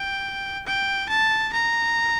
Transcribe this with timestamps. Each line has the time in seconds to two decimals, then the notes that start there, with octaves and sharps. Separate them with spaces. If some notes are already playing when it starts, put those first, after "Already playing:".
Already playing: G5
0.67 G5
1.10 A5
1.54 A#5